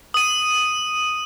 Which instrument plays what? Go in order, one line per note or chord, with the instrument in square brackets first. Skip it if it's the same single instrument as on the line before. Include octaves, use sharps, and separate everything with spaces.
[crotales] D#6 D#7